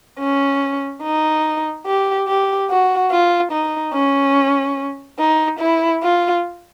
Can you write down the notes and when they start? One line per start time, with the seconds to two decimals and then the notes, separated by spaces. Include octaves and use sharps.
0.19 C#4
1.03 D#4
1.86 G4
2.28 G4
2.70 F#4
3.11 F4
3.52 D#4
3.94 C#4
5.19 D#4
5.60 E4
6.02 F4